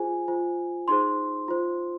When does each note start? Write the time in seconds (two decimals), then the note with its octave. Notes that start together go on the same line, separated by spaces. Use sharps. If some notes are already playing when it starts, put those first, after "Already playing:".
Already playing: F4 G#4 C5 G#5
0.28 F4 C5
0.88 D#4 G#4 C5 C6
1.48 F4 C5